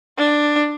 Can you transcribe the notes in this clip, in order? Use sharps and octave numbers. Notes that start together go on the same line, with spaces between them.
D4